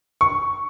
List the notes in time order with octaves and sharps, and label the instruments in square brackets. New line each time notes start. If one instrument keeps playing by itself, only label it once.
[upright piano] C#6